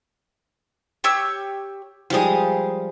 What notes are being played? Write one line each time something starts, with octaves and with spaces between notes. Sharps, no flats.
G4 C#5 E6
F3 G3 G#3 F5 D#6